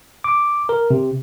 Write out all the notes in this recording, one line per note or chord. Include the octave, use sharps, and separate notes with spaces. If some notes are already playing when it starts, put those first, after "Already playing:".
D6
A#4
C3